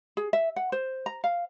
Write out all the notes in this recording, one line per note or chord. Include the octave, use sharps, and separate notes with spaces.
G#4
E5
F#5
C5
A#5
F5